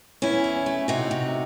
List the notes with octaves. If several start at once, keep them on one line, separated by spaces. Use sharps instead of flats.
E2 C#4 E4
E2
A3
C3 D#4 F#4
C3